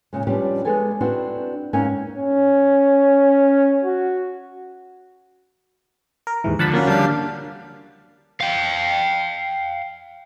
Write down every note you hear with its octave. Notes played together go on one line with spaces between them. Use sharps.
A#2 C#3 G#3
F3 G3 B3 C#4 D4 G4
G#3 B3 G#4 A4 D5 G#5
C4 D4 E4 F#4 B4
G#2 A#3 C#4 E5 G5 G#5
C#4
F#4
A#4
D#2 G#2 E3
D3 F3 F#5 A5 B5
A#3 C#4 F#4
D3 G3 D4 F5
F5 G5